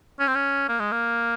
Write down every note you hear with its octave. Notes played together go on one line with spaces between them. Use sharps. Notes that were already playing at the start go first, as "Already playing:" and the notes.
C#4
C4
C#4
A#3
G#3
A#3